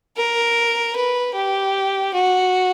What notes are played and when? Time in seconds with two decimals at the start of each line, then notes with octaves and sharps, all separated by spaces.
0.17 A#4
0.96 B4
1.35 G4
2.14 F#4